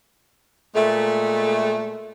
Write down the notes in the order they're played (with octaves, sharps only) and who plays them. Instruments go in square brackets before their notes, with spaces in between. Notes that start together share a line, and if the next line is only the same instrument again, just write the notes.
[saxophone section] A#2 G#3 A3